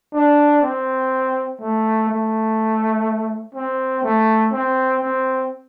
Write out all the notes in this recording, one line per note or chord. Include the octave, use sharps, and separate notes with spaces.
D4
C4
A3
A3
C4
A3
C4
C4